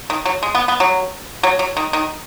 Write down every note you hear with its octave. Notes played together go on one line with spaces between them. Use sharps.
D#3
F#3
G#3
B3
B3
F#3
F#3
F#3
D#3
D#3